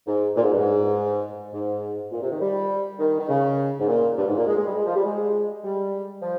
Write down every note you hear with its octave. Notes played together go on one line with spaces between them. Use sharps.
G#2
A#2
G#2
G2
G#2
G#2
A#2
C3
D#3
G3
D#3
D#3
C#3
G#2
A#2
G2
G#2
A#2
G#3
G#3
G3
G#3
F3
G3
G#3
G3
F3